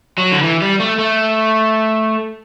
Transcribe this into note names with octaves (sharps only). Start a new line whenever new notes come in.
F#3
D3
E3
G3
A3
A3